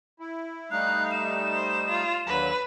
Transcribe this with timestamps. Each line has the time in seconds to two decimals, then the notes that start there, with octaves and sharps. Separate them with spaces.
0.20 E4
0.71 G3 A3 D#4 F5 F#6
1.11 E7
1.54 C5
1.89 F4
2.27 D#2 D3 F#3 B4